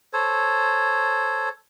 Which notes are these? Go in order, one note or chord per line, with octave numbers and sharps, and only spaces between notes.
A4 C5 C#5